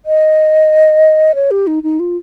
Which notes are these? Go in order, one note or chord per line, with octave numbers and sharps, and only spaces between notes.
D#5
C#5
G4
D#4
D#4
F4